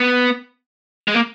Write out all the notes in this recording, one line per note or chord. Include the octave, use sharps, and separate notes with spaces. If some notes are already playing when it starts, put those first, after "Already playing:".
Already playing: B3
G#3
A#3